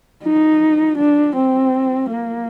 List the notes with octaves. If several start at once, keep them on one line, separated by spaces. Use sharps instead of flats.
D#4
D4
C4
A#3